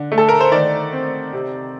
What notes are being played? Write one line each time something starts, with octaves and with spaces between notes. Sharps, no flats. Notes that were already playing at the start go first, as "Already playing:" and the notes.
Already playing: D3
A3
A4
A#4
C5
D#3 D5
C4
C3